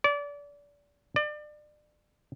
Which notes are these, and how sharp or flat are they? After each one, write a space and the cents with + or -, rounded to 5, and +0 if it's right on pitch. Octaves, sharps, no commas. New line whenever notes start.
D5 -30
D5 +30